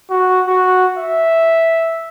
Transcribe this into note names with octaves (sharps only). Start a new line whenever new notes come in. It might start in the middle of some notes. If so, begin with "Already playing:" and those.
F#4
F#4
E5